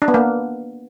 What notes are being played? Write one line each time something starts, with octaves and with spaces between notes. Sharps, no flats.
D4
B3
A#3